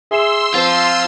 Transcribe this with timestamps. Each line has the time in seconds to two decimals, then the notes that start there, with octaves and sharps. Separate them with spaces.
0.11 G#4 E5 C6 E6
0.55 F3 C4 F4